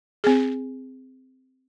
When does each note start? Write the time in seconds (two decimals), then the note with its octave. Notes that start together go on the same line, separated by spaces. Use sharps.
0.24 C4 G#4